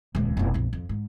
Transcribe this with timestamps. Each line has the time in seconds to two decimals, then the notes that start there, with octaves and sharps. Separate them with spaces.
0.15 D#1 C#2
0.37 F1 B2
0.54 A#1 F2
0.73 F2
0.89 G#2